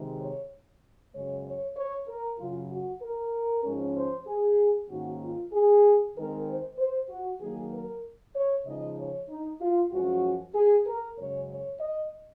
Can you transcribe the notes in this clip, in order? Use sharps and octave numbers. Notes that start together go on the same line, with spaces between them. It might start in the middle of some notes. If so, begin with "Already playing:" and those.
Already playing: C3 D#3 G#3
C#5
F#2 C#3 G#3 C#5
C#5
C#5
A#4
F#2 C#3 F#3 F4
F#4
A#4
G#2 F3 G#3 C#4
C5
G#4
G#2 D#3 A#3 C#4 F#4
F4
G#4
D#3 G#3 C4 A#4
C5
C5
F#4
D#3 F#3 A#3 G#4
A#4
C#5
C#3 F3 G#3 D#4 D#5
C#5
D#4
F4
F#2 F3 G#3 C#4 F#4
G#4
A#4
F#2 C#3 G#3 C#5
C#5
D#5